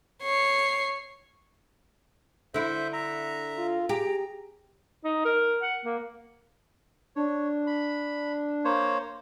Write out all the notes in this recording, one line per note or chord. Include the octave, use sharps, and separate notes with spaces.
C#5 C7
D3 E4 C5 E5
E5 A#5
F4
G4 G#4 A#5
D#4
A#4
F#5
A#3
D4 C#5
B5
A#3 C5 C#5